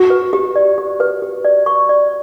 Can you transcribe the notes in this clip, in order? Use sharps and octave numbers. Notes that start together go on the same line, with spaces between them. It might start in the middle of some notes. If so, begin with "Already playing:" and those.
Already playing: F#4
B4
G4
D5
G4
B4
G4
D5
C#6
D5